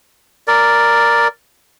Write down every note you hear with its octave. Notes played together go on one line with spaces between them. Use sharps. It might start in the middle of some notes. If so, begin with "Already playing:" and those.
A#4 D5